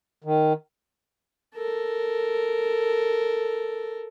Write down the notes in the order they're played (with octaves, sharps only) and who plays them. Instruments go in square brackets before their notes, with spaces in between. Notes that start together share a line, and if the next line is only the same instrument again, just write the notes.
[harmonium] D#3
[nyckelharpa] A4 A#4